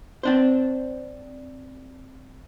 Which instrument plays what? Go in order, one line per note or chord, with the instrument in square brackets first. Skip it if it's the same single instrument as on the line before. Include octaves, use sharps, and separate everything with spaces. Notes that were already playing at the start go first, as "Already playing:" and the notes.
[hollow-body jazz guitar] C4 D4 C5